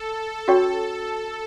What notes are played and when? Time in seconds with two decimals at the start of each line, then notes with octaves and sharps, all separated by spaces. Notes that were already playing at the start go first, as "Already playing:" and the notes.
Already playing: A4
0.48 C#4 F#4 C#5 G5 C#6